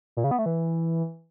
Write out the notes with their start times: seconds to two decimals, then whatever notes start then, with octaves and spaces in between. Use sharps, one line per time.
0.17 A#2
0.24 C#3
0.31 B3
0.39 A3
0.46 E3